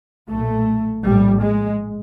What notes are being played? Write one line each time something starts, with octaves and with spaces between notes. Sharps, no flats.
B1 A#2 A3
A#1 A2 G3
G#3